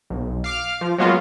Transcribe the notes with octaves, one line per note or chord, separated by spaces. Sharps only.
B1
F5 D6 F6
F3
F#3 G#3 A#3 B3 C#4 F4